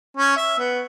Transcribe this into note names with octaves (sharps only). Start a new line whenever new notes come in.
C#4
E5
B3